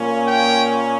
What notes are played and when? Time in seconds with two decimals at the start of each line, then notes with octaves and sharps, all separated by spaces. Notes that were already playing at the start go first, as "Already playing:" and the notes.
Already playing: A#2 A#3 C#4
0.28 G5